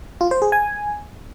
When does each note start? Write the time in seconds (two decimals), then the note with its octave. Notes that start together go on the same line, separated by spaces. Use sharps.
0.21 F4
0.31 C5
0.42 G#4
0.52 G#5